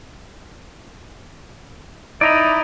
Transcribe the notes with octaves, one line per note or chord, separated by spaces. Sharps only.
D#4 E4 D5 D#5 A#5